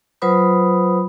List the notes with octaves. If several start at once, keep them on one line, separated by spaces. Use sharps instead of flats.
F#3 F4 B4 C5 B5 D#6